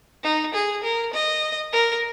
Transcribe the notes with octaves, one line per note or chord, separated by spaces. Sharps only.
D#4
G#4
A#4
D#5
A#4